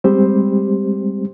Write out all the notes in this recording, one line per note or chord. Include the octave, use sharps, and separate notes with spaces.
G3 G#3 C4 G4 C5